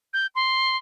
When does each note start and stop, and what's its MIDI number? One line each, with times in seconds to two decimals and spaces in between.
0.13 0.27 91
0.35 0.77 84